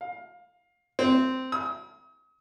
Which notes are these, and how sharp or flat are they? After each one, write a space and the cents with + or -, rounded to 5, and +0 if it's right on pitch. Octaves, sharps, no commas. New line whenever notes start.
F5 +20
C4 -10
D#6 +40